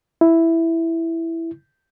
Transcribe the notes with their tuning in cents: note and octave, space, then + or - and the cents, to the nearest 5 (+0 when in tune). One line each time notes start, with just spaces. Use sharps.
E4 +0